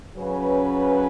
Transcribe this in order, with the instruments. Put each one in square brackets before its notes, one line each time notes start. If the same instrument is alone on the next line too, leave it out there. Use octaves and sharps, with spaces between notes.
[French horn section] C#3 F#3 C#4 B4